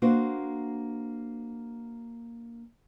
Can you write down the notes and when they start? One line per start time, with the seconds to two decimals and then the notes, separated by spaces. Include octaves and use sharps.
0.02 A#3 D4 F#4 C5